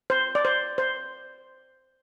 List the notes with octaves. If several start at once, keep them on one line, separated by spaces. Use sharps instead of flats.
C5
D5
C5
C5